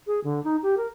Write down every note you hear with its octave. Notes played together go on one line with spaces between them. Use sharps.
G#4
D3
D#4
G4
A#4